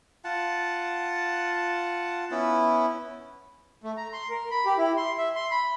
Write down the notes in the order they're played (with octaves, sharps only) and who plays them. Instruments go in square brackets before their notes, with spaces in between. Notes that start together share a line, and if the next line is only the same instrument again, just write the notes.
[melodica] F4 F#5 A5
B3 C#4 E4
[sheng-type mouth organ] A3
A#5
C6
A#4
B5
G4
E4
C6
E5
C6
B5